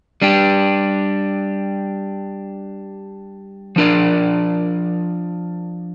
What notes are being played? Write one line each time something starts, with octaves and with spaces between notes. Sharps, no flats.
G3 D4 G4
F3 D4 A#4 D5